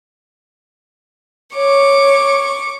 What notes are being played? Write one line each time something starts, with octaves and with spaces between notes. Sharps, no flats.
C#5 C#6 D6